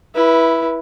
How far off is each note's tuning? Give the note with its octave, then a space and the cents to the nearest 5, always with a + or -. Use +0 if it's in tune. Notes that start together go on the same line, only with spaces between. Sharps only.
E4 +0 B4 -20